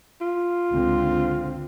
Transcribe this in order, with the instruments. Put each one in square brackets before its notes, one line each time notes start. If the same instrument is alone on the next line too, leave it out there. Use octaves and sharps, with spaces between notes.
[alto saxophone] F4
[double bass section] C#2 D3 C4